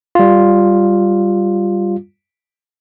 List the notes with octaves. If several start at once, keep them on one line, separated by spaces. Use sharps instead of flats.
G3 F4